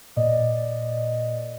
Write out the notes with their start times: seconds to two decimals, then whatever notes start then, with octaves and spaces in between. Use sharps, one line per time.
0.16 A#2 D5 D#5